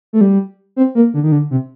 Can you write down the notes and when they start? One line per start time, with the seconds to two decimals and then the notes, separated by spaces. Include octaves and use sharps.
0.13 A3
0.21 G3
0.76 C4
0.95 A#3
1.14 D3
1.23 D#3
1.32 D3
1.51 C3